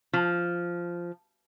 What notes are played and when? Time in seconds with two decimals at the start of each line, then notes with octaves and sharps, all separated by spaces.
0.13 F3